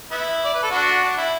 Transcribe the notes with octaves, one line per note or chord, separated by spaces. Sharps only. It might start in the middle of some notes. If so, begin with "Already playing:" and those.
B3 E4
D5
B4
A4
D4 F#4
D4
E4